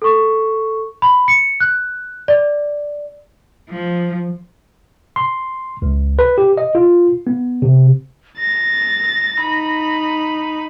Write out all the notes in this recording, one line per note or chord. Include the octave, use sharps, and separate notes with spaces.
A4 C#6
B5
C#7
F#6
D5
F3
C6
C#2
B4
G4
D#5
F4
B3
C3
A6 A#6
D#4 B5